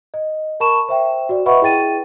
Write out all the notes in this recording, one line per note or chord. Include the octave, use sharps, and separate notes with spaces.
D#5
A#4 A5 B5 C#6 E7
C5 E5 G5
F#4 D5
B4 D#5 E5 F#5 B5 C#6
E4 G#4 G5 A6 D#7